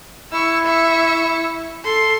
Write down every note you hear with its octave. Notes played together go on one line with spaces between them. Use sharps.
E4 C#6 E6
E5 C#6
A4 C6